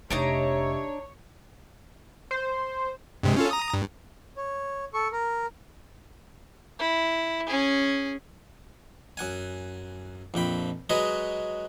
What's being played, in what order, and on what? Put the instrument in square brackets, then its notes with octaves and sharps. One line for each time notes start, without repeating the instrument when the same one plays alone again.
[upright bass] F1 [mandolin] D4 D#4 A#5 [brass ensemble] G4 D#5 E5 [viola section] C#5
[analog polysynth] C5
[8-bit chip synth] G2 C3 G#3
C#4 F4 A4
A#5 D#6
G2
[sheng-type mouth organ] C#5
A4 C#6
A#4
[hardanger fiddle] E4
C#4 G#4
[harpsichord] F#2 F#5 G#5
A#1 F2 G5 B5
F#3 G#3 F#4 B4 C#5 D#5